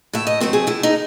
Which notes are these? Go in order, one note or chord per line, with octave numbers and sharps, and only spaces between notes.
A2 E5
D#5
F#3 A3 C4 C5
G#4
A2 E4
D#4